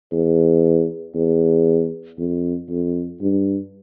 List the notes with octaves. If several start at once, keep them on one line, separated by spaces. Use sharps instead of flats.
E2
E2
F2
F2
G2